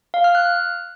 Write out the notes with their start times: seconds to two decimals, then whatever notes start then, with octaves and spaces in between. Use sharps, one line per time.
0.14 F5
0.24 F6
0.35 F#6